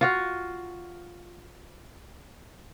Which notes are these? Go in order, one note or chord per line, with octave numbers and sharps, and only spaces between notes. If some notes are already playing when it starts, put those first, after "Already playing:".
F4 F#4 F5